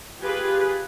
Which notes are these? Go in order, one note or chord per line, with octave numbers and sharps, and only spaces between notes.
F4 G4 G#4 B4